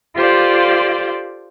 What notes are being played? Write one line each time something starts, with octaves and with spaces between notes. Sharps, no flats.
F4 G4 A4 C5 D5 F5